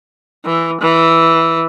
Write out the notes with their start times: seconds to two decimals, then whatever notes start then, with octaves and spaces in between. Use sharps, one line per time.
0.45 E3
0.81 E3